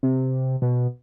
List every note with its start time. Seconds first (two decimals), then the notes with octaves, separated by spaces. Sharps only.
0.03 C3
0.62 B2